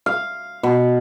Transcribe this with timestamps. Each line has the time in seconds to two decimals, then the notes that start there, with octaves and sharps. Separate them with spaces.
0.06 F5
0.63 B2